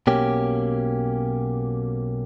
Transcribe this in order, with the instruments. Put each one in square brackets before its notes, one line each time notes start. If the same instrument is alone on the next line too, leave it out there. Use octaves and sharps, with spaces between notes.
[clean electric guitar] B1 B2 A#3 C#4 G4